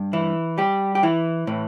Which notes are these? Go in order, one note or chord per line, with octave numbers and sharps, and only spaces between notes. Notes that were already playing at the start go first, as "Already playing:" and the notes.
Already playing: G2
E3 E4
G3 G4
G4
E3 E4
A2 E3